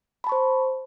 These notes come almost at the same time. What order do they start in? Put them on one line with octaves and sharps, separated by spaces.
B5 A5 C#6 C5